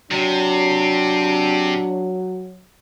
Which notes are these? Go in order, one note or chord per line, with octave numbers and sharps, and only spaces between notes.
C3 F#3 D4